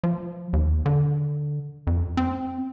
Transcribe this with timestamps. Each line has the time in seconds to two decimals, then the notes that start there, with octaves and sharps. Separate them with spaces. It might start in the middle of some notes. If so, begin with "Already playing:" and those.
0.04 F3
0.53 D#2
0.86 D3
1.87 F2
2.17 C4